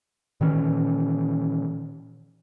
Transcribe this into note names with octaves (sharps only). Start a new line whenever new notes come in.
A#2 D#3 E3 C#4